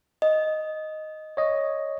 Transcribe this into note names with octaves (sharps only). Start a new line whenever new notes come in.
D#5
C#5 D#5